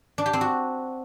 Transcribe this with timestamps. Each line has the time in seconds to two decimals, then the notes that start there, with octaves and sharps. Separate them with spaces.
0.18 D4
0.26 G4
0.33 C4
0.41 F#4